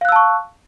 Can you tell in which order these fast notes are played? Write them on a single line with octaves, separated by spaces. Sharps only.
F5 F#6 E6 A5 C#6